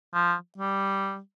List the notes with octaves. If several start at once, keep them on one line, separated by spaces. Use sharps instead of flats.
F3
G3